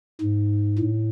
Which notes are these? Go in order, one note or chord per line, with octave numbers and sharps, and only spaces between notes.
G#2
A2